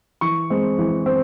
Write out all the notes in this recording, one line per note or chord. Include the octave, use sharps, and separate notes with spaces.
E3 C#6
G#3 C4
E3
C4